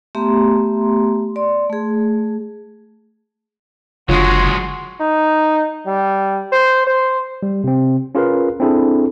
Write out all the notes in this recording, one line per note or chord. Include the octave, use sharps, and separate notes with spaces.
A3 B3 G4 E5 A#5 C6
D5 C6
A3 G#4
F#1 D3 F#3 G#3 F4 F#4 C#5 C6
D#4
G3
C5
C5
G3
C3 C4
C#4 F4 G#4 A#4 B4 F5
C4 D4 E4 G#4 A4